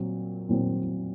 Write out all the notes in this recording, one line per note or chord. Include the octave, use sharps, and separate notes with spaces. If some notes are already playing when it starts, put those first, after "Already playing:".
Already playing: A#2 F#3 C4
A#2 F#3 C4